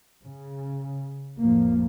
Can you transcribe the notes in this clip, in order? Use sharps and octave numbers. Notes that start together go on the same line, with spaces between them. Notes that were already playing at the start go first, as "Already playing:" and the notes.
C#3
A1 F2 A2 F3 A#3